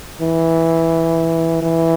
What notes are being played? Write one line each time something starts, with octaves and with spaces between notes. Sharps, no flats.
E3
E3